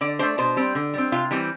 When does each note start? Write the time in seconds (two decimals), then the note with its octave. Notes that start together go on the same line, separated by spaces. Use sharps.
0.01 D3 D5
0.19 A3 D4 C5
0.38 B2 C5
0.57 G3 C4
0.75 D3
0.94 G3 C4
1.12 C3 F4
1.31 E3 G3 C4